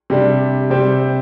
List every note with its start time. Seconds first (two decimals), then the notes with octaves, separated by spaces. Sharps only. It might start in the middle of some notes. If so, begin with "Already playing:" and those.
0.10 C3 G3 D4
0.70 C3 G3 C4